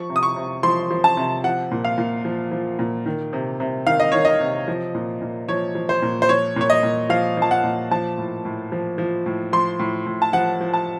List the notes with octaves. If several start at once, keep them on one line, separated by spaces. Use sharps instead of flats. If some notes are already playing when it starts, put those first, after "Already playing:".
Already playing: F3 C#6
C3
D#6
C#6
C3
F3 C6
F3
A5
C3
F3 F#5
A#2
F5
A#2
F3
F3
A#2
D#3
C3
C3
D#3 F5
D#5
D#3 C#5
D#5
C3
F3
A#2
A#2
F3 C#5
F3
C5
A#2
C5
F3 C#5
A#2 C#5
D#5
A#2
F3 F5
F3 A5
F#5
A#2
F3 A5
A2
A2
F3
F3
A2
F3 C6
A2
A2
A5
F3 F#5
F3
A5